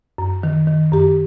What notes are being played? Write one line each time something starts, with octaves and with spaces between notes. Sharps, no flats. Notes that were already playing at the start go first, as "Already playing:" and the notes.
F#2
D#3
D#3
F#2 G4